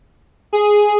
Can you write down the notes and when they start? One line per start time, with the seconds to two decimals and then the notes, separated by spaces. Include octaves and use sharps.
0.53 G#4